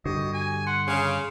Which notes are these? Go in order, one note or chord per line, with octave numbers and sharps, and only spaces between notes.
G2 D3 F#4 G4 D#5
G#5
F#5 C6 C#7
C#3 F5